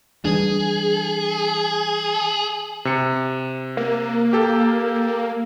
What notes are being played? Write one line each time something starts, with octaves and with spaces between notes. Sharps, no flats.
E3 G3 D4 G#4
C3 C#7
A#3
G4 A4